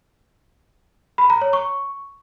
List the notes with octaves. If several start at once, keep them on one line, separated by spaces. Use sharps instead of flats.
B5
A#5
C#5
C#6